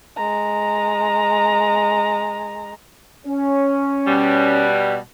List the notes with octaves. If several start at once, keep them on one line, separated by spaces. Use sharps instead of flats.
G#3 A#5
C#4
B2 G3